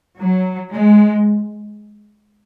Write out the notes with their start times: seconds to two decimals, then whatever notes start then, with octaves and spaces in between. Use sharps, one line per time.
0.18 F#3
0.72 G#3